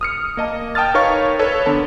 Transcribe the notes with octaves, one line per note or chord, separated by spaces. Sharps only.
D#6 F6 C#7
A#3 D#5 A5
G5 A5 D#6 F6 A6
D#4 A#4 B4 C#5 F5 C#6
A4 B4 C#5
D3 B3 A#4 A5